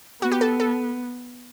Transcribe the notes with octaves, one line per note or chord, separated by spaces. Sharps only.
B3 F#4
G4
A4
A4